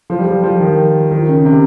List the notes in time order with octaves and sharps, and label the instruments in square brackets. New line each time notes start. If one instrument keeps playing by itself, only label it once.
[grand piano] F3
G3
F3
F3
D#3
D#3
C#3
C3